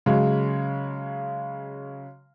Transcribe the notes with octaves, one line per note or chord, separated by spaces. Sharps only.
C#3 F#3 G#3